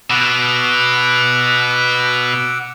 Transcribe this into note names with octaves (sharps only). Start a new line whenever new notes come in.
B2 F#5 D6 E6